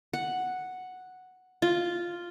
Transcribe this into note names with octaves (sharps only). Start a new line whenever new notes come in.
F#5
F4